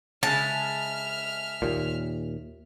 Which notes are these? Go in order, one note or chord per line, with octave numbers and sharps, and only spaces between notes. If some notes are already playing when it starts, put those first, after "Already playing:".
C#3 G#3 E5 A5 F6
D#2 A#2